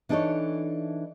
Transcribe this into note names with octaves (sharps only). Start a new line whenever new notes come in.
E3 D4 D#4 F#4 A4 C#5